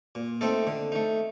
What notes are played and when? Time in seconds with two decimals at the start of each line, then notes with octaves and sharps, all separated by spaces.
0.15 A#2
0.41 A3 C4 D#4 A4
0.67 D3
0.92 A3 D#4